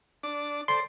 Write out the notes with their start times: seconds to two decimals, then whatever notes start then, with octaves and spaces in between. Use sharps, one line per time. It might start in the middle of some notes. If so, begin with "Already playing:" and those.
0.23 D4 D6
0.68 A4 C5 D5 C6